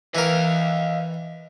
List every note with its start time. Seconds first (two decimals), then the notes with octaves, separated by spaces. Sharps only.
0.15 E3 A#4 D#5 F5